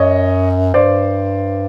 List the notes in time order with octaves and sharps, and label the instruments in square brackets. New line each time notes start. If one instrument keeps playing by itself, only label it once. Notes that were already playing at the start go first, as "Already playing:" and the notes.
Already playing: [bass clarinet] F#2 [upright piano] C#5 D#5
[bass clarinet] G2 [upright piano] C5 D5